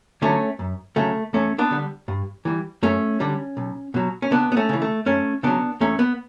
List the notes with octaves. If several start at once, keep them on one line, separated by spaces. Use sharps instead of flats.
D3 F#3 A3 C#4
F#2
C#3 F#3 A3
E2 A3 C#4
B3 D4
D3 G3
G2
E3 G3
F#2 A3 C#4
D3 G3
B1
B2 F#3
C#4
C#2 B3 D4
B3
A3 C#4
C#3 E3
A3
F#2 A3 C#4
C#3 F#3 B3 D4
E2 A3 C#4
B3